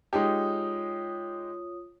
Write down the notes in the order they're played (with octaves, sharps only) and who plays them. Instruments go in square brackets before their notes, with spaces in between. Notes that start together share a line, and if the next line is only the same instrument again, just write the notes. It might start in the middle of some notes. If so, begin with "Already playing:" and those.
[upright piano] G#3 D#4 G4 [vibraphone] F4 C#5 D#6